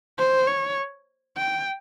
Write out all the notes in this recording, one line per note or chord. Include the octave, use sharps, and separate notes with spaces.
C5
C#5
G5